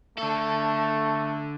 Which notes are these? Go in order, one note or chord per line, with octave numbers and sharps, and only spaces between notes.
D3 A3 A4